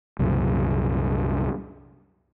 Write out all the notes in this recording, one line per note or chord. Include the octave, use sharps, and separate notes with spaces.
C2 F#2 A#2 C#3